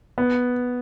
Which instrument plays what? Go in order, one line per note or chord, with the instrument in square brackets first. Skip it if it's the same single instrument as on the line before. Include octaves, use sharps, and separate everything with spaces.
[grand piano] B3